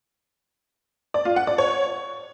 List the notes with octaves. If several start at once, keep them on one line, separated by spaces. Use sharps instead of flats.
D5
F4
F#5
D5
C#5